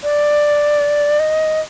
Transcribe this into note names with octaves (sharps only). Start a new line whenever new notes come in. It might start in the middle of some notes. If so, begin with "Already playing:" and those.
D5
D#5